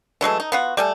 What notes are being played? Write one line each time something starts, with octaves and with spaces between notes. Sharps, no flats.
E3 F#3 G#3 A3
D#4
B3 F4 F#4
G3 A3 G#5